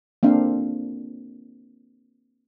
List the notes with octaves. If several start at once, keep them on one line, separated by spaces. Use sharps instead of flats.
A#3 C4 D4 F5